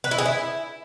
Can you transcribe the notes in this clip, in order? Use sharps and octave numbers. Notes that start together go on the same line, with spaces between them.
B4
E4
G#4
E4